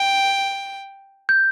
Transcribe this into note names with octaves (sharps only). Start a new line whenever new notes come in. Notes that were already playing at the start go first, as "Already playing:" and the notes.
Already playing: G5
G6